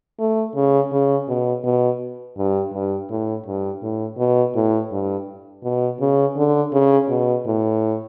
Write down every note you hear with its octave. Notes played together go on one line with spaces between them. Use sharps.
A3
C#3
C#3
B2
B2
G2
G2
A2
G2
A2
B2
A2
G2
B2
C#3
D3
C#3
B2
A2